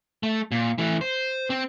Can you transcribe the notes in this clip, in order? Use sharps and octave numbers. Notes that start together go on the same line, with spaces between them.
A3
A#2
E3 A3
C5
C4